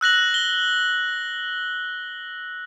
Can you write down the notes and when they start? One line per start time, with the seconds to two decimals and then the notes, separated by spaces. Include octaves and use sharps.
0.01 E6 F#6 A#6 F#7
0.34 G7